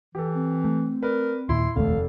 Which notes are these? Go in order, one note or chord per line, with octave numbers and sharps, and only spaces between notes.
E3 G4 A4
C4
A3
A#4 B4 D5
D#2 A#2 E4 C6
F1 A#1 D#2 A3 A4 F5